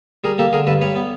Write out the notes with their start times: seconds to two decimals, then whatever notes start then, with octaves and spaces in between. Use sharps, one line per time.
0.24 G3 G#4 A#4
0.38 A#3 G4 A4
0.53 D3 G#4 A#4
0.67 G2 A4 B4
0.81 G3 B4 C#5
0.96 B3